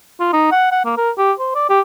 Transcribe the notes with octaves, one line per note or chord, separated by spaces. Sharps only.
F4
D#4
F#5
F#5
A#3
A#4
G4
C5
D5
G4